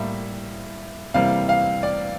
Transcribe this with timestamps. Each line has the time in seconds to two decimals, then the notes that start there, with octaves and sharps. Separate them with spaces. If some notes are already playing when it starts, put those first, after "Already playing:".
Already playing: A2 G3 A#3 E5
1.14 C3 E3 G3 A#3 F5
1.49 F5
1.83 D5